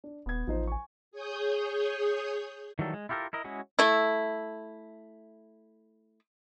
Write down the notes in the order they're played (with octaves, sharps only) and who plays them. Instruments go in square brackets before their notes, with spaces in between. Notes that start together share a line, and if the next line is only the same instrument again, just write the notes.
[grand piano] D4
[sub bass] D#1 [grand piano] B3 G#6
[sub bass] A1 [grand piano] F3 D#4 C5
[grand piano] G#5 C#6
[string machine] G#4 C#5 D#6 G6
[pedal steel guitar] D#3 E3 F#3 G3 A4
G#3
E4 F4 G4 A4 A#4
E4 A#4 D#5
G#3 C#4 E4 F#4 G#4
[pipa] A3 E4